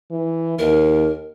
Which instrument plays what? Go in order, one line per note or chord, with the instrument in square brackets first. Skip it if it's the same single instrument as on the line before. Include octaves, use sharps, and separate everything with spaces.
[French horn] E3
[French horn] D#2 [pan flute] A#4